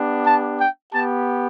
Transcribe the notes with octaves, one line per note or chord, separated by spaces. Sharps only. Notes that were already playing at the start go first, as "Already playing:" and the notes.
Already playing: B3 D4 G4
A5
G5
B3 G4 A5